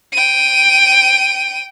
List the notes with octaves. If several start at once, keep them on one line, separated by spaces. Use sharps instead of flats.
G5 D#7